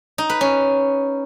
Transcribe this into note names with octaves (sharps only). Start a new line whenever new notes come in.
D#4
B4
C#4